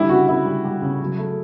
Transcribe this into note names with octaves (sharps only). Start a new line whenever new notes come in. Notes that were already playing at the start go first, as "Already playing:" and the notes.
Already playing: D3 G3 E4
C#3 F#4
C#3 E4
G3
G3
C#3
F#3
A3